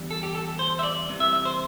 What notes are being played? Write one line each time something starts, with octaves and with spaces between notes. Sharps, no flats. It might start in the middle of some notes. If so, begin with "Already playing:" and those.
Already playing: E2 D3 G3
A4
G4
A4
C5
E5
D5
C2 C3 E3
E5
E5
C5